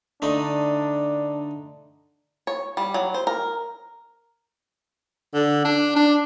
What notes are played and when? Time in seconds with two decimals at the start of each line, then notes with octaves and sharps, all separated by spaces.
0.22 D3 A3 D4 D#4
2.47 C#5
2.77 G3
2.94 F#3
3.14 C5
3.27 A#4
5.34 D3
5.65 D4
5.96 D4